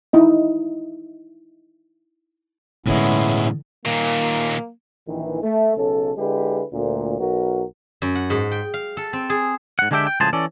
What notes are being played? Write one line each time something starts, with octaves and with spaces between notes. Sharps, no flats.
D#4 E4 D#5
A2 D3 E3 G#3 B3 C#4 E4
D#2 A#2 A#3
A#1 D#3 E3
A3
B1 C#3 C#4 A4
D3 G#3 E4 G4 G#4 B4
D2 A#2
B1 F#4 A#4
F#2
F#5
G#2
G5
F5
A4
C4
G#4
G#2 F#5
D3 G#3 D4 G4 E5 G5
G5
C#2 A2 F3 G#4 C5 A5
E3 C#4 A4 D5